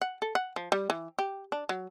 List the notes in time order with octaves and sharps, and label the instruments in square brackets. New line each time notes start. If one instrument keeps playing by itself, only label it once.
[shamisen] F#5
A4
F#5
F3
G3
E3
G4
D4
F#3